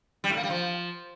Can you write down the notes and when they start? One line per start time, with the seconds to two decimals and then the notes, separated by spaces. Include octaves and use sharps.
0.24 G3
0.30 A2
0.37 A#3
0.43 G3
0.50 F3